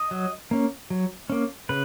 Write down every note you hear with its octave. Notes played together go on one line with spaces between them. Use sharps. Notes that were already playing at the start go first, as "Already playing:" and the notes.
Already playing: D#5
F#3
A#3 C#4
F#3
A#3 C#4
C#3 B4